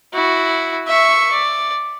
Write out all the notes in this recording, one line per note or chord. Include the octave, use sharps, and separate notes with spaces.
E4 F#4
E5 C#6
D5